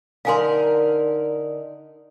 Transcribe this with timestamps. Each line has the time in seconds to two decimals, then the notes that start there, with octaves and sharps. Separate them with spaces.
0.25 D3 D#4 A#4 D5 F5 G#5 C6